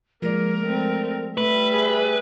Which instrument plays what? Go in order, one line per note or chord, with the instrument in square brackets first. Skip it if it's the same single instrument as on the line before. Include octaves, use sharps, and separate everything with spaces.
[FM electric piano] F3 G#3 D5 [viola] A#3 [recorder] A#4
[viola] A3 C4
[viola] G3 E5 [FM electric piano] A3 [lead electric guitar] B4
[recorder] G#4